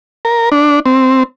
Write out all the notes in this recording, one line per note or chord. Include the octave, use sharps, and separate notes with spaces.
A#4
D4
C4